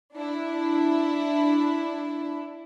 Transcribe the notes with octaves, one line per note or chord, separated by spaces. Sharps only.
D4 E4